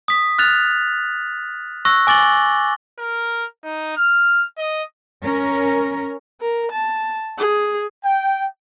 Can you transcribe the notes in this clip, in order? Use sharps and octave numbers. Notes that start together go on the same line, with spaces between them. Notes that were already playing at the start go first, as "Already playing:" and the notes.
D#6 B6
F6 F#6 A6 F7
C#6 E6 F#6 A#6
G#5 D6 A6 F#7 G7
A#4
D#4
F6
D#5
C#4 A#4
A#4
A5
G#4
G5